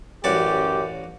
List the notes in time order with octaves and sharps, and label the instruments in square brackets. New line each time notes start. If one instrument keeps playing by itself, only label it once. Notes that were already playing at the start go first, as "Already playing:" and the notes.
[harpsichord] A1 F#4 D5 [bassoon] F#2 [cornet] G4